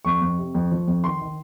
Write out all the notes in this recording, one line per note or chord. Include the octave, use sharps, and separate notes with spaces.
F2 C#6
F2
C3
F2
F3
F2
D#3 C6
D#3